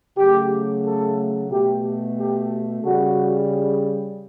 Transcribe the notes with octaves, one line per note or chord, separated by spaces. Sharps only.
C#3 F#3 A3 G4
A4
B2 A3 G4
G4
C#3 G3 F#4